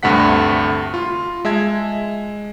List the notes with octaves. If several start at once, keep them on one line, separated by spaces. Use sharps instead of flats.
D2 G2 C3 A3 F#5 B6
F4
G#3 E5 A5 G#6